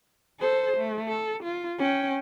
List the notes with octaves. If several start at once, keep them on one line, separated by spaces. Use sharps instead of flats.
A4 C5
A3
A4
F4
C#4 G5